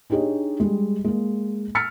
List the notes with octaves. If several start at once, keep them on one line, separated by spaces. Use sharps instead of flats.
D4 D#4 G4 G#4 C#5 D#5
G3 G#3
G#3 A#3
E6 F6 A6 B6 C#7